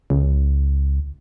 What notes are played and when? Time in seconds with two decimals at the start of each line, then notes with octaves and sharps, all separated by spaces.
0.10 C#2